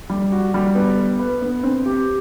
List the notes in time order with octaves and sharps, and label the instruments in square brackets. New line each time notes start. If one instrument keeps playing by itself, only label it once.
[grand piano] G3
F#4
G3
B3
B3
B4
B3
C4
G4